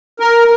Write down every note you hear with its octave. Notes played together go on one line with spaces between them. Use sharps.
A#4